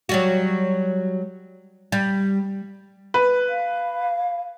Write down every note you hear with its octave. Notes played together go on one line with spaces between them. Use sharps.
F#3 G3 F#4
G3
B4
F5